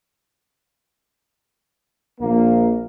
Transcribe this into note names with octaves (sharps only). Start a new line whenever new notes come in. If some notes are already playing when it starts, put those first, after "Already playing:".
A#1 A#3